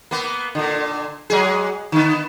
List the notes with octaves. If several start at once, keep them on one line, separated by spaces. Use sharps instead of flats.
A#3 B3
A#2 D3
F#3 G#3 G#4
D3 B3